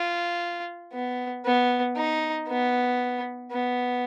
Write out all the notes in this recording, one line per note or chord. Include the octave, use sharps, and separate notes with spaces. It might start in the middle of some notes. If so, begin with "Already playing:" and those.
Already playing: F4
B3
B3
D#4
B3
B3